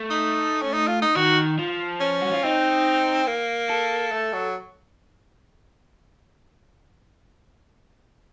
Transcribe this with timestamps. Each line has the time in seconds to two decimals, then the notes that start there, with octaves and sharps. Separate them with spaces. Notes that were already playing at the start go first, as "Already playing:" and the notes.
Already playing: A3
0.11 D#4
0.62 C#4
0.74 D#4
0.88 F4
1.02 D#4
1.16 D#3 F#4
1.59 F3
2.01 C#4
2.22 F#4
2.33 F4
2.43 C4 D#4
3.27 A#3
3.70 A4
4.12 A3
4.33 F#3